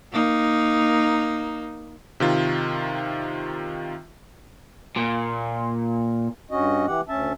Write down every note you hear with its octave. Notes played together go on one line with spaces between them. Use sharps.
A#3 D#4
C3 D#3 F4
A#2
G2 C#4 F#4 D#5
E3 G4 F#5
D2 C#4 E5 A5